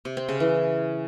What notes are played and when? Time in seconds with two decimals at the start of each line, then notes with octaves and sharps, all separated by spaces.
0.05 C3
0.17 C4
0.29 C#3
0.40 E3